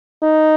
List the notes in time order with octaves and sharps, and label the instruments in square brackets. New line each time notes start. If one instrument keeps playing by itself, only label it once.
[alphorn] D#4